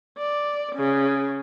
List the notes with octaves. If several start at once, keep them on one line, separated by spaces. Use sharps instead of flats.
D5
C#3